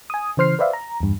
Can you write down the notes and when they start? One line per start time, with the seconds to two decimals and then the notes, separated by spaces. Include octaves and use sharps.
0.10 G#5 D#6
0.37 C#3 E3 C5 F6 C7
0.59 B4 C5 D5 E5 F5
0.73 A#5
1.00 E2 G2